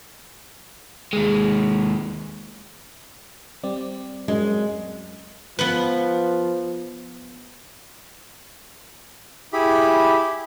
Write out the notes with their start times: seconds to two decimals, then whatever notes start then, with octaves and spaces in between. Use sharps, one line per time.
1.13 D#2 G#3
3.64 G3 C4 D5
4.28 F#2 G#3
5.59 F3 B3 B4
9.53 E4 G4 G#4 B5